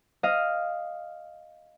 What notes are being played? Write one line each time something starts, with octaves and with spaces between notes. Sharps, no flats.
D#5 F5